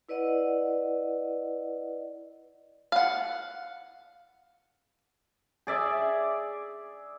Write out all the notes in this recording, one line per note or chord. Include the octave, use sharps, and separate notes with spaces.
E4 B4 D5 D#5 F#5
F5 F#5
G#4 D5 E5